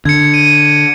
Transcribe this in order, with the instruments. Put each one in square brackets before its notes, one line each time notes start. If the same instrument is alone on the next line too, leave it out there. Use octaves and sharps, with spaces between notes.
[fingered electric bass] D3 [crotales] G#6 C#7
[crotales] D#7